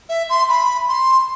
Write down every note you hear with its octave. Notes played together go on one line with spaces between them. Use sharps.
E5
C6
B5
C6